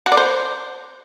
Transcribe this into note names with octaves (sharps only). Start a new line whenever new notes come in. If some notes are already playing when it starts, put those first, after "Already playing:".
F#4
D5
C5